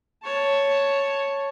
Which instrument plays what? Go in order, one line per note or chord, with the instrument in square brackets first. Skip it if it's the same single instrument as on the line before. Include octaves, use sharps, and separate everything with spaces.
[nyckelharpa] C#5 A5